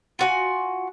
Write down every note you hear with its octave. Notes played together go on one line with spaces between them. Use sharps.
F4 F#4 G#5